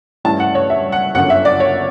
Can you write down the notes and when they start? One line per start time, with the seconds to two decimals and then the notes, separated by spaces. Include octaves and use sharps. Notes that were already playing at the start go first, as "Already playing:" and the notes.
0.24 G2 E3 A3 C#4 E4 A5
0.40 F#5
0.55 C#5
0.70 E5
0.92 F#5
1.15 G1 F#2 D3 F#5
1.30 E5
1.45 D5
1.60 C#5